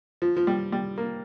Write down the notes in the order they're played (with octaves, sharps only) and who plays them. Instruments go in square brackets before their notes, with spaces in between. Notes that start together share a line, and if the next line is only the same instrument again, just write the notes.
[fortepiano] F3
F3
G3
G3
A#3